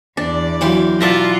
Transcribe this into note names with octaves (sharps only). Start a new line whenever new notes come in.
E2 D4 D5
F#2 E3 F5 G5 B5 C6
B1 F4 D5 E5 F#5 G5 A5 A#5